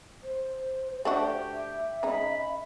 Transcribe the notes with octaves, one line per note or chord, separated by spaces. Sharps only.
C5
A3 D4 F#4 G4
E5
C#3 G#3 D#4 B5